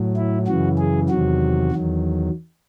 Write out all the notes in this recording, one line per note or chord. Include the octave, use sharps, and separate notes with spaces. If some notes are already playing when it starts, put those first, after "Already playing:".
Already playing: A2 F#3
E4
F#2 C#3 E3 F#4
G#4
E2 C3 D#3 F#3 F#4
E2 D#3 F#3